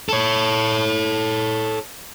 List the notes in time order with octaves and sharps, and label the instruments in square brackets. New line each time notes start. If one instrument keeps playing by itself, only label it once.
[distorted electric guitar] A4 C#5